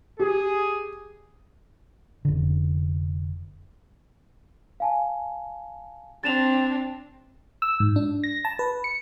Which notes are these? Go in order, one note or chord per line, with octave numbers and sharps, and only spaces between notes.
G4 G#4
F1 D3
F5 G#5 A5
C4 D4 A6 E7 F7
E6
G#2
D4
A#6
A5
B4
C#7